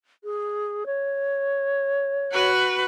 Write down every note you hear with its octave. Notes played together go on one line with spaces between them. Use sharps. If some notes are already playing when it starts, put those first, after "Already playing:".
G#4
C#5
F#4 B4